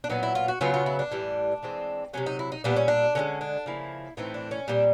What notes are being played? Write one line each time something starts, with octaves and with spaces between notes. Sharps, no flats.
D4
A#2 F#3 B3 D#4
E4
F4
F#4
C#3 F#3 B3 F4
F4
E4
D4
A2 E3 G3
E3 G#3 C4
C3 D#3 F#3 C#4
D#4
E4
D#4
A#2 G3 B3 D4
C#4
D4
D3 F3 G#3 C#4
D4
C#3 F3 A#3 E4
A2 E3 A3 C4 D#4
D4
C#4
A#2 G3 C4 D4